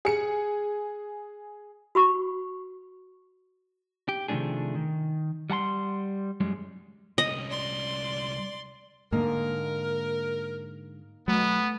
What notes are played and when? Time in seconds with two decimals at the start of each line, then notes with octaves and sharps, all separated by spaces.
0.05 G#4 C#7
1.95 F#4 B5 C#6
4.09 G4
4.28 C3 D#3 F3 A3 D4 G#4
4.75 D#3
5.50 G3 F#5 A5 C6
6.40 F#2 G3 G#3
7.18 C2 C#4 D#5
7.50 D5 C6
9.12 G#2 D3 A#3 D#4 A#4
11.28 B2 F#3 A3 B3